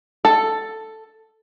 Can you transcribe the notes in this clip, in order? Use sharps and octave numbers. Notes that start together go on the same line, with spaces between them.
A4